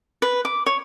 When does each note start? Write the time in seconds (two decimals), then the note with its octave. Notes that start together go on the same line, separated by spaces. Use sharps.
0.22 B4
0.45 D6
0.66 C#5